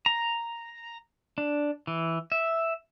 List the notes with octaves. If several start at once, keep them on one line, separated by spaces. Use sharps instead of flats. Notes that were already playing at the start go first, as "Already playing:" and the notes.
A#5
D4
E3
E5